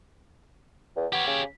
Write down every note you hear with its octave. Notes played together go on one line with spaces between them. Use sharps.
E2
B3 G4 C#5
C#3